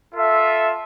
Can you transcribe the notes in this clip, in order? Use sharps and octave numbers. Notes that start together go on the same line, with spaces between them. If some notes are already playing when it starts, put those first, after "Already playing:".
F4 A4 E5